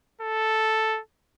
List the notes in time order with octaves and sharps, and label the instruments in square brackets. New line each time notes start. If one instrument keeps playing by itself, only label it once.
[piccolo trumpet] A4